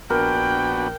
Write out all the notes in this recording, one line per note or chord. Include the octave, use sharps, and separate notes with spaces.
A#1 B3 D4 F#4 A#4 G5